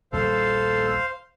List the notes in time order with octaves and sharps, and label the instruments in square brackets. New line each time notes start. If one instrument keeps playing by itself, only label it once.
[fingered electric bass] A#1 D#2 G3 [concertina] A4 [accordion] C5 F5